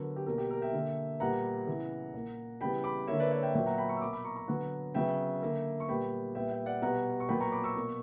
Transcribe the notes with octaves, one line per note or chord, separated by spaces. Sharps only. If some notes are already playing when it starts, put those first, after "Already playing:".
Already playing: D3 F#3 B3 A#4
G4
B2 A#3 A#4
G4
A#4
E5 G5
D3 A#3
A#2 G3 B3 F#5 A#5
C#3 E3 B3
A#2 A#3
C#3 E3 G3 B3 G5 B5
B5 D6
D3 A#3 C#5 E5
B4 D5
C#5 E5
E5 G5
A#2 F#3 B3 E5 G5
F#5 A#5
G5 B5
A#5 C#6
E6
B2 A#3 B5 D6
B5 D6
A#5 C#6
A#5 C#6
D3 F#3 B3 F#5 A#5
C#3 F#3 B3 E5 G5
D3 A#3
C#6
A#2 G3 B3 G5 B5
A#2 G3 B3 E5 G5
E5 G5
D5 F#5
B2 G3 B3 F#5 A#5
C#6
A#2 F#3 B3 G5 B5
A#5 C#6
B5 D6
C#6 E6
B2 A#3